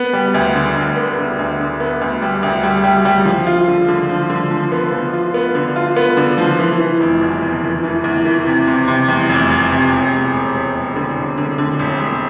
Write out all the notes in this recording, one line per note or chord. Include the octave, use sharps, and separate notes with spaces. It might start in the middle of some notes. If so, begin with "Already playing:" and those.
Already playing: B3
G3
D2
D3
D2
B3
D3
D2
D3
B3
D2
G3
D2
G3
G3
G3
F3
F4
D3
D3
F3
D3
F3
B3
F3
F4
B3
D3
F4
B3
D3
F3
E3
E3
F1
E2
E2
E3
E3
E2
E3
C3
C3
C3
E2
F1
F1
C3
E1
E1
E1
E1
E1
D3
E1
D3
D3
E1
E1